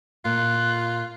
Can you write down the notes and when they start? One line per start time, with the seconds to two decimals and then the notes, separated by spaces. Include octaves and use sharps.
0.25 A#2 F4 F#6